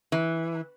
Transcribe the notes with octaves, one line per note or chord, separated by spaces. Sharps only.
E3